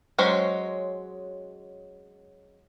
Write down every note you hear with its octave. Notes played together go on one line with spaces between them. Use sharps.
F#3 G#3 C#4 C5